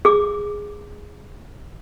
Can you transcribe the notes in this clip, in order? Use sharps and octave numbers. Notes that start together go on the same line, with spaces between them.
G#4 D6